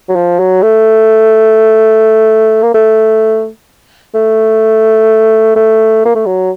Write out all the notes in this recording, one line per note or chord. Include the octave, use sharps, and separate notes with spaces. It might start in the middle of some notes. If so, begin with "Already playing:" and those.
F#3
F3
F#3
A3
A#3
A3
A3
A3
A#3
A3
F#3